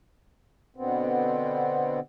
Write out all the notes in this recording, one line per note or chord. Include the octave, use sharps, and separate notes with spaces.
B2 D3 B3 C4